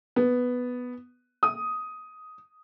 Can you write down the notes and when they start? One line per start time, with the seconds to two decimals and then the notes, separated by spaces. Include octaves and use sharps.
0.16 B3
1.43 D#6